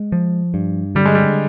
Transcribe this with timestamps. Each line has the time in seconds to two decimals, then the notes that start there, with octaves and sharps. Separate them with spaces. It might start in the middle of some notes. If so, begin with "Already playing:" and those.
Already playing: G#3
0.12 F3
0.54 G2
0.95 D3 G3
1.06 G#3
1.15 G3